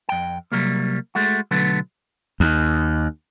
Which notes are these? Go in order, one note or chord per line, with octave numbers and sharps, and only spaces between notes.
F2 G5
C3 F#3 G3 A#3
G#3 A3 F#4
B1 D3 F#3 A3 B3
D#2